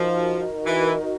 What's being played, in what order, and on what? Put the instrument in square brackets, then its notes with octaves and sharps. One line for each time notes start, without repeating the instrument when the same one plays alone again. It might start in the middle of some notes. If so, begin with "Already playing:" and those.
Already playing: [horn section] F3 [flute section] D#4 F#4 A#4 D#5
[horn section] E3